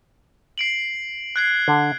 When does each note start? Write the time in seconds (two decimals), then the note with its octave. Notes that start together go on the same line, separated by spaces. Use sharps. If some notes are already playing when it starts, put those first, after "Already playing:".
0.58 C7 D7 F#7
1.36 F#6 G#6 C7
1.68 D3